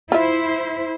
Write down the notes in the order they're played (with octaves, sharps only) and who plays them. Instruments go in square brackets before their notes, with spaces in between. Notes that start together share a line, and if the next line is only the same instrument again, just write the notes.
[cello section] E4 C5 [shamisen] F4 E5